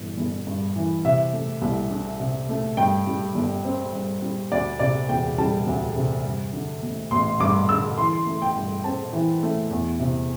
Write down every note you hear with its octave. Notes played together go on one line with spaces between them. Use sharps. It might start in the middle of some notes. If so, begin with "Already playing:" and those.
Already playing: G1 E3
G1
G2
E3
C3 E5
A3
C2
D4
C3
A3
G2 G5
G3
G1
C4
G2
G3
D2 D5
C3 D5
E1 G5
G3 A5
D2
C3
G2
D3
A1
A1 C6
G2 D6
D3 E6
E3 C6
A3
G5
G2
C4 A5
E3
A3
E2
C3